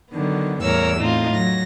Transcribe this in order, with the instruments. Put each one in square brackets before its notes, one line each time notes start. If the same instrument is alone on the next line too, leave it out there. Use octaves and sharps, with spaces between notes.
[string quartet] D3 D#3 F#3 B3
E2 A2 G3 A#4 C#5 E6
A2 C4 D#4 F4
F#3 A#6